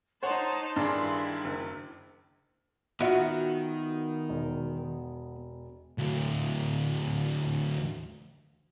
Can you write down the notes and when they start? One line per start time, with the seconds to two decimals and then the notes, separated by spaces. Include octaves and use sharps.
0.23 D#4 C5 C#5 F#5 A5 C6
0.76 G2 D#3 D4 E4 G#4
1.44 F#1
3.00 D#3 B3 F4 F#4 E5 F#5 F6
4.29 E1
5.98 D2 F#3